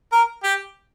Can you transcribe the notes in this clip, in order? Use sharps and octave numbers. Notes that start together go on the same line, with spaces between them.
A#4
G4